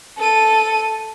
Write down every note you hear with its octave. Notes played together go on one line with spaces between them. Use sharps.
A4 D#7